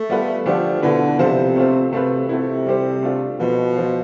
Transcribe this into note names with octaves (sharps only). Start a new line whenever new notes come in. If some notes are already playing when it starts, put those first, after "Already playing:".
Already playing: A3
G3 B3 F4 B4
D3 F3 A3 D4 G4 C5
B2 D3 B3 E4 B4
C3 F3 B3 F4 A4 C5
A3 C4 F4 C5
C3 A3 C4 F4 B4
C3 A3 C4 E4
G3 C4 G4 C5
A3 D4 F4
B2 F3 B3 F4
F3 B3 F4 C5